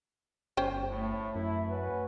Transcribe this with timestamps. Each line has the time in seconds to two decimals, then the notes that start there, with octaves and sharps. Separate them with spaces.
0.57 G1 C#4 C5 G5
0.90 A2 A3
1.35 F#2 E4
1.70 C#4 F#4 B4